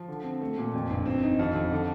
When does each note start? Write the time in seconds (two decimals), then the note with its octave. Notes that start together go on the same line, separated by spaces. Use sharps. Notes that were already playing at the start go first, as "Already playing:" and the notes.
Already playing: F3
0.08 D3
0.24 C4
0.41 A3
0.58 A#2
0.74 F2
0.90 G1
1.06 C4
1.23 D#4
1.39 F2
1.55 F2
1.72 D3